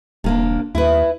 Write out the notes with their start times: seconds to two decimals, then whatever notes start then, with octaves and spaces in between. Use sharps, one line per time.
0.24 D#1 C3 A#3 D4
0.75 D#2 E4 B4